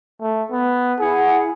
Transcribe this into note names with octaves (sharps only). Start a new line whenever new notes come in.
A3
B3
E4 G#4 F#5